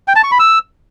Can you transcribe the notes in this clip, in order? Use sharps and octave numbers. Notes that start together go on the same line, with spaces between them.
G5
A5
C#6
B5
E6